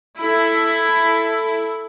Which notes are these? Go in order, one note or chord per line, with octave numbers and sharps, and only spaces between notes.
E4 A4